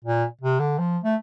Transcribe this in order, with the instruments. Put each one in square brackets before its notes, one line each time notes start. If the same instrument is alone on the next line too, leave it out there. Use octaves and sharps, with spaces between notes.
[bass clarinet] A#2
C3
D3
F3
A3